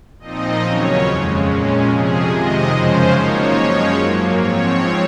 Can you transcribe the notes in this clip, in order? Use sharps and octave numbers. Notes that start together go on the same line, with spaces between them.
A#2 F3 C4 D#4 D#5
D#2 C#3 F#3 C#4 C#5
F2 C#3 G#3
A#2 G#3 C#4
F2 C3 F3 G#4
C3 D#3 G#3 D#5
F#2 C#3 F3 G#3 C#4 C5
F#2 F3 A#3 D#4 C#5
F#2 F3 G#3 C#4
G#2 F#3 A#3
G#2 F3 C4 C#5